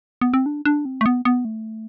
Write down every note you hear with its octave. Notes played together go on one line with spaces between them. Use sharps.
B3
C4
D4
D4
C4
A3
B3
B3
A3